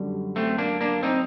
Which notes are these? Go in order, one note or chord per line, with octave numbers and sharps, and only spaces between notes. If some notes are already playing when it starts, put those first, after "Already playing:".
Already playing: F#2 D3 G3
A3 C4
A#3 D4
A#3 D4
C4 D#4